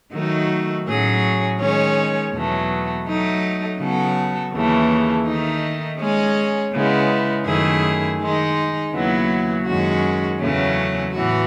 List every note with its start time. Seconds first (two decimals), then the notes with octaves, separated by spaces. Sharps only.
0.13 D#3 F#3 A3 D#4 F#4
0.85 A2 F#3 C#4 G#4
1.59 D#3 G#3 C#4 G#4 C#5
2.32 E2 B2 F#3 A3
3.06 F#3 A3 D#4
3.79 C#3 F#3 B3 F#4 A4
4.52 D#2 C#3 E3 A3
5.26 D#3 A3 D#4
5.99 G#3 C#4 G#4 C#5
6.72 C#3 G#3 B3 E4
7.46 F#2 D#3 A3 E4 G#4
8.19 D#3 G#3 D#4
8.93 D#2 C#3 F#3 B3 E4
9.66 F#2 D#3 G#3 C#4 F#4
10.40 E2 C#3 F#3 A3 C#4
11.12 A2 E3 B3 F#4